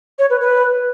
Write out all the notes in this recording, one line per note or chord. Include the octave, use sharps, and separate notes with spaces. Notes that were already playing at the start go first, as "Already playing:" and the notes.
C#5
B4
B4